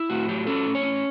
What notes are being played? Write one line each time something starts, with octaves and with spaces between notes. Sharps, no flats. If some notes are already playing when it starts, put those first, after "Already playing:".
Already playing: E4
A2 F#4
F#3 G4
C#4 A4
A2
C#5
C#4